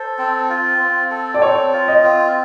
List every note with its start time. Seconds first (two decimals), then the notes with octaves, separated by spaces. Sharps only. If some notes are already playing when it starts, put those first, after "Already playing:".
Already playing: A4 C5
0.18 C4
0.49 F4
0.80 C4
1.11 A4
1.34 D5
1.42 C4 C#5
1.73 F4
1.88 D#5
2.03 C4